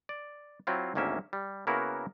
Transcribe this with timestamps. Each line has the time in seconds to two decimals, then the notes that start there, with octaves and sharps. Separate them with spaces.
0.09 D5
0.67 F#3 C4 E4 F4
0.95 G#1 D2 A#3 C#4 E5 G5
1.33 G3
1.67 C#3 A#3 B3 E4 F#4 A#4